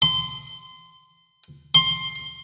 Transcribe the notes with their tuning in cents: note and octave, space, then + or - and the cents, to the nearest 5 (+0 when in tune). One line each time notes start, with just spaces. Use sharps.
C6 -25
C6 +10